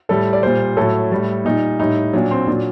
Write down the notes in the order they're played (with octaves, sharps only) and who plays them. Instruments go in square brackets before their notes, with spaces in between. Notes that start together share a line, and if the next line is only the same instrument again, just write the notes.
[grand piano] A2 G3 A4
D5
A#2 G3 C5
A2 F#3 A4
A2 G3
A#2 G3 D#4
A2 G3 D#4
A#2 F#3 D4
C4
A#2 F#3 D4